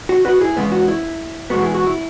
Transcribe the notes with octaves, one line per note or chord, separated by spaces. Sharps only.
F#4
F#4 B4
E4 G#4
E2 C#3 G#3 B3
F#4
E4
E2 B2 G#3 B3 F#4
E4 G#4
F#4
E4